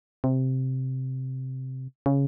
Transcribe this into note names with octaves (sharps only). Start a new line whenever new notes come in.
C3
C#3